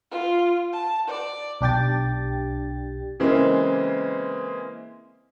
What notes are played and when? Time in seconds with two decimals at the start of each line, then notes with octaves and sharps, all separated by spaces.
0.11 F4
0.73 A5
1.08 D5
1.61 B1 D4 G4 G5 A6
3.20 C#3 E3 G#3 A#3 C4